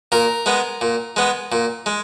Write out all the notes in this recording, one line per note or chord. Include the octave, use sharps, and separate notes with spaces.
A#2 A#4
G#3 B3
A#2
G#3 B3
A#2
G#3